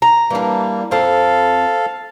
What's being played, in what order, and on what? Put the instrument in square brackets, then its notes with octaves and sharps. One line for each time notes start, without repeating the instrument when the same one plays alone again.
[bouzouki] A#5
[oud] E3 D4 [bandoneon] G3 A#3
[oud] F2 C4 [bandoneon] A4 F5